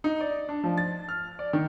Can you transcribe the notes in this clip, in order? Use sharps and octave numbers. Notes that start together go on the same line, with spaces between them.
D#4
D5
D4
F3
A6
F6
D5
D#3